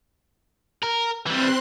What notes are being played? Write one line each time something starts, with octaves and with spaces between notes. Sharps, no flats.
A#4
E3 G3 C4 C6 F#6